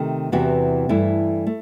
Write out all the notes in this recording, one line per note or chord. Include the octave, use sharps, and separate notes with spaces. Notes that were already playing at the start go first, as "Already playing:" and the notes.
Already playing: C3 D#3 A3
E2 C3 E3 B3 F#4
G2 E3 A3 E4
A3